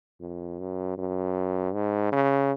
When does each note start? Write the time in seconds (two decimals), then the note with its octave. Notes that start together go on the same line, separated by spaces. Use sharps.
0.21 F2
0.59 F#2
0.98 F#2
1.73 G#2
2.12 C#3